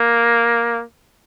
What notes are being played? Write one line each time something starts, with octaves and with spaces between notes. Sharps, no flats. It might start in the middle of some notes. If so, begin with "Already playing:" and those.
Already playing: A#3